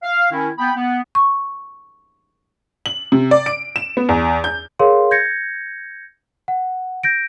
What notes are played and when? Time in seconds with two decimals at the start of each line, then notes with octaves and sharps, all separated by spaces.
0.03 F5
0.32 D#3 C#4 E4
0.58 B3 G5 B5
0.76 B3
1.15 C#6
2.86 F#7
3.12 C3
3.31 D5
3.46 D7
3.76 E7
3.97 B3
4.09 E2
4.44 G6
4.79 G#4 A#4 C#5 F5 C6
5.11 G6 G#6 A#6 C#7
6.48 F#5
7.03 G6 A#6 D7